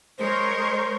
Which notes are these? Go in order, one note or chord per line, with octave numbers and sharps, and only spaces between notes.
G#3 A#4 C5 C#5